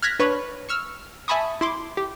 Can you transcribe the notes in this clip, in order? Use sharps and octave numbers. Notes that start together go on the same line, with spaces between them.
F6 F#6 G#6 A#6 B6
D4 B4 C#5 B5 C#6
C#6 E6 F6
E5 G#5 A5 B5 C#6 D#6
E4 C6 D6
G4